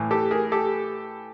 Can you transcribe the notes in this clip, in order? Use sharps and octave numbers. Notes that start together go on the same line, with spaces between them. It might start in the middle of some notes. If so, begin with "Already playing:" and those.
Already playing: A2 E3
G4 A4
G#4 A#4
G4 A4